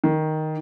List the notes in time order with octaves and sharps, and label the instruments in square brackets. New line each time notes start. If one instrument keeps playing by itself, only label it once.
[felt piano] D#3